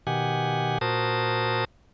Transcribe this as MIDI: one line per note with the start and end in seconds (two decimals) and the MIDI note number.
0.07 0.78 47
0.07 0.78 51
0.07 0.78 67
0.07 0.78 78
0.07 0.78 80
0.81 1.65 46
0.81 1.65 66
0.81 1.65 70
0.81 1.65 72
0.81 1.65 81
0.81 1.65 87